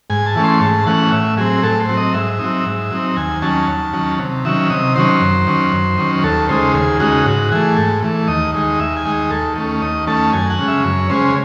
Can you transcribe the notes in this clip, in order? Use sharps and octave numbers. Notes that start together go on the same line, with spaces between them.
G#2 G#5
A5
E3 A3 C#4
C6
G#2 A5
E3 A3 C#4 F#5
A2 E5
F#3 C4 G#4
A2 A4
C5
F#3 C4
D#5
G#2 E5
F#3 C4 D#4
G#2
F#3 C4 D#4
D#2 G#5
D#3 F#3 C#4 A5
D#2
D#3 F#3 C#4
C3
D#3 F#3 C#4 E5
C3 D#5
D#3 F#3 C#4 C5
F#2
D#3 F#3 C#4
F#2
D#3 F#3 C#4
D#2 A4
C#3 G#3 D#4 C5
D#2 G#4
C#3 G#3 D#4 F#4
G#2 F#4
E3 A3 G#4
G#2 A4
E3 A3
D#2 D#5
D#3 G#3 D#4
D#2 E5
G#5
D#3 G#3 D#4
D#2 A4
D#3 A3 C#4
D#2 D#5
D#3 A3 C#4 A5
F#2 G#5
F#5
C#3 G#3 C#4
E5
F#2 C#5
C#3 G#3 C#4 C5